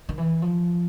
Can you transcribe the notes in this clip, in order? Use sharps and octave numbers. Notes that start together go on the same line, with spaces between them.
D#3
E3
F3